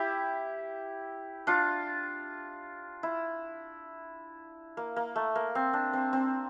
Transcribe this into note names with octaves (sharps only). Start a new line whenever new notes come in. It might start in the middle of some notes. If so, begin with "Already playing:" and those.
Already playing: E4 G4
D4 F4
E4
A#3
A#3
A3
A#3
C4
D4
C4
C4